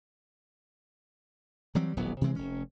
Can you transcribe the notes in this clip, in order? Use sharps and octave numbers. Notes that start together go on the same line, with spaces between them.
E3 F#3 G3 C4
D#1 A1 F#3 B3
C3 E3 G#3 C4
F1 C#4